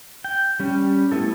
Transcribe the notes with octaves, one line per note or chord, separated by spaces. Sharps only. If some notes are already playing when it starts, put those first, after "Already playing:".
G5
G3 C#4
A3 B3 E4 A4